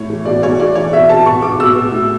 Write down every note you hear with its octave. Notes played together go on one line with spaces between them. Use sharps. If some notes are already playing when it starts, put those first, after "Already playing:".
Already playing: A2 C#5
E3
B2 D5
B2 C#5
E3 D5
E3 C#5
B2 E5
B2 A5
B2 C#6
B2 D6
B2 E6
B2
A2